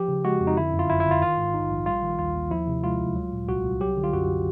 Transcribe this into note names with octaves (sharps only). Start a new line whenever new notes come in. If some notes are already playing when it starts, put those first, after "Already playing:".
Already playing: F3 G4
C#3
G#3 F#4
F2
D#4
D3 E4
F#2
F4
G1 E4
E4
G1
F4
D#3 F4
G#2
A#1 D#4
A#1
G3 F4
D#3
D#2 F4
D#2
F3 E4
C3
G#3 F4
D2
F#3
A#2
C2 F#4
C2
F#3 G4
D3
F4
F#2 F#4